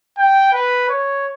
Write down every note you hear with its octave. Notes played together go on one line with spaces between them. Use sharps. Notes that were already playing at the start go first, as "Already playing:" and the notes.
G5
B4
C#5